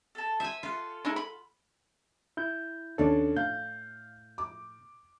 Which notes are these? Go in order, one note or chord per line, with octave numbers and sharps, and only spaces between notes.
A4 A5
C5 E5 G#5
F4 A4 F#5
G#3 D#4 E4
B5
E4 G6
D#2 C#4 D4 A4
A2 F5 G6
D6